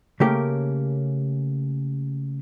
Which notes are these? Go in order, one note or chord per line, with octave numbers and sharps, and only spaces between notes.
C#3 A3 A#3 C#4 G4 A#4